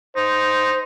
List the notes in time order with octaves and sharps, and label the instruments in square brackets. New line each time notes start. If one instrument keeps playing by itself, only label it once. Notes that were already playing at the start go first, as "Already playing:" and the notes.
[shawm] D#4 [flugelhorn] C5